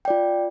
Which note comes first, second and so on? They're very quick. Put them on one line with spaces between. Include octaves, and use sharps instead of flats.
G5 D5 F4